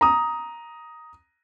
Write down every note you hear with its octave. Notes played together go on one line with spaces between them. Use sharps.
A#5 D#6